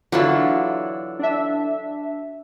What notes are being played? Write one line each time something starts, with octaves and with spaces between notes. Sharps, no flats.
D3 E3 F#3 E4 F4
D4 E5